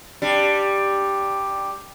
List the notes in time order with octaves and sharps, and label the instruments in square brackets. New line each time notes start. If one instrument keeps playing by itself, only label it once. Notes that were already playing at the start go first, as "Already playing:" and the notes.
[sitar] G3 D4